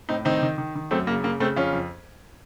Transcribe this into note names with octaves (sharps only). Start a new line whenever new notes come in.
A2 C4 D#4
D#3 C4 D#4
D#3
D#3
D#3
F#2 A3 C4
C#3 A#3
C#3 A#3
C#3 A3 C4
F2 C#4 F4
F2